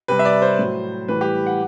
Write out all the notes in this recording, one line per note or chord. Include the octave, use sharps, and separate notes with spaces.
C3 G3 B4
E5
D5
C5
A2 F#3
A2 E3 G3 B4
G4
F#5